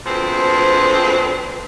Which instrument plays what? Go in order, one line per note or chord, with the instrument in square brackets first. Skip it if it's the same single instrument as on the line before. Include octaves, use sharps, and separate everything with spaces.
[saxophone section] D2 F3 B3 C4 G#4 B4